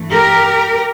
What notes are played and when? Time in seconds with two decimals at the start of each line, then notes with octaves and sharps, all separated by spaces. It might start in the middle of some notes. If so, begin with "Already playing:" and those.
Already playing: G2 E3 A3
0.09 G4 A#4